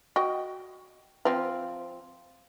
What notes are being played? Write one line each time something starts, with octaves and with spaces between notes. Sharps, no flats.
F#4 D#5 G5
F3 C4 C5